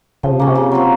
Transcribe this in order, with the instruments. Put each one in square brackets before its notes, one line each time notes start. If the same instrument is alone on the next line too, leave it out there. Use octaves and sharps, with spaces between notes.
[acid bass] C#3 [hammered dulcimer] F3
[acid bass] C3
[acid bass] C#3 [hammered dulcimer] A#3 C#4
[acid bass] C3
[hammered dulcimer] C#3
F#3 C4 F4